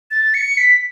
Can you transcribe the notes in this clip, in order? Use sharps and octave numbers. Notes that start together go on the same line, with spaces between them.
A6
C#7
B6